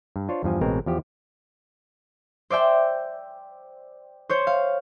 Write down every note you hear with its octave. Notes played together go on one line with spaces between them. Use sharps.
G2
D4 F4 C5 C#5
E2 G2 F3 G#5
A1 B2 G#3 C4 A#4
E2 F3 G4
C5 D5 E5 G5
C5 C#5 G6
F5